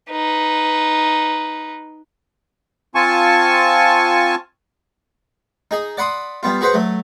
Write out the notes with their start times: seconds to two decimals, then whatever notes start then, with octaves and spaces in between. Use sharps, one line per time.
0.11 D#4 B4
2.95 C4 F4 G#5 A5 C#6
5.71 D#4 G#4
5.97 D5 F#5 B5 C6 D#6
6.43 G3 B3 F4
6.61 F#4 G#4 B4 C5 F#5
6.74 F#3 A3